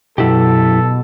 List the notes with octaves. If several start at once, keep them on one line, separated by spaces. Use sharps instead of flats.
F#2 B2 E4 G4 A4